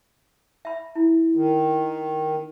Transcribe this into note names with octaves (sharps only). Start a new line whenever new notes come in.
E5 B5
E4
D#3